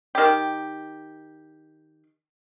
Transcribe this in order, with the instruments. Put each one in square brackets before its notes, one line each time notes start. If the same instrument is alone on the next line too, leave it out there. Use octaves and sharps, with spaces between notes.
[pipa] D#3 G4